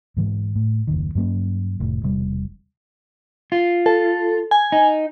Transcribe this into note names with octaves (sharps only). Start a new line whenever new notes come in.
G#2 E3 G#3
A2
F#1 D#2 D#3
G2 F#3 A#3 C#4
F1 A2
E1 C3 G3
F4
A4
G#5
D#4